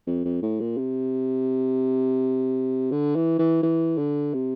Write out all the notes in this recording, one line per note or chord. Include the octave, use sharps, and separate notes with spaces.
F2
F2
A2
A#2
C3
D3
E3
E3
E3
D3
C3